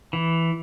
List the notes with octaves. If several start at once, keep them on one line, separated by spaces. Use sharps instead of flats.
E3